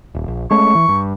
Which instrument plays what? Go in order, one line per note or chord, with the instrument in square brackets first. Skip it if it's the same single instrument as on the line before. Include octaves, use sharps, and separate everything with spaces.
[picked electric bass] D#1
A#1
[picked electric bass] G#3 A3 C#4 [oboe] C#6
[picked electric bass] E3
G2